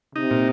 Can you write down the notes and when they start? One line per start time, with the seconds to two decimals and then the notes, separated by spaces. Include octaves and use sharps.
0.16 C3 D#4
0.31 A#2